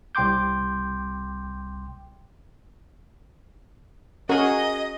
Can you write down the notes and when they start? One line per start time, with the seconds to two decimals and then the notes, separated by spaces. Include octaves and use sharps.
0.15 C2 G5 C6 D6 G6
4.29 C#4 F#4 G#4 A#4 D#5